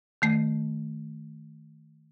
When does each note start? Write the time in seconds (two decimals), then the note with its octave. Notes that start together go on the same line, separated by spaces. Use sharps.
0.22 D#3 A3